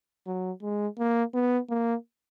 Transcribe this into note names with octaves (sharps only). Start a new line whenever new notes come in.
F#3
G#3
A#3
B3
A#3